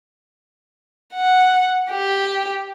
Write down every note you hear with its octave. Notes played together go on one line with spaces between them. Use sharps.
F#5
G4